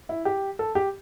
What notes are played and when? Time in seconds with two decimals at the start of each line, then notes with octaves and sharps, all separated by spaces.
0.09 E4
0.25 G4
0.59 A4
0.75 G4